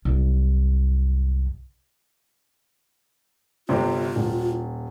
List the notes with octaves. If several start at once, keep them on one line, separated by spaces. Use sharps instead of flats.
C2 F#2
G1 C3 C4 F4
D#1